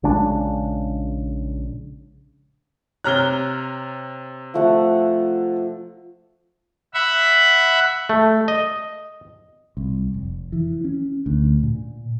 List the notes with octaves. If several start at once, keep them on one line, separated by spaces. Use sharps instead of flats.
A#1 C#3 G#3 D4
C3 C#5 A#5 F6 F#6 G7
F3 A3 F#5
E5 F#5 B5
A3
D#5
C2
F1
E3
C#4
D2
A#2